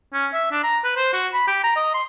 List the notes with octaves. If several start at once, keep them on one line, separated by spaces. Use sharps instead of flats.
C#4
E5
D4
A#5
B4
C5
F#4
B5
G4
A#5
D#5
C6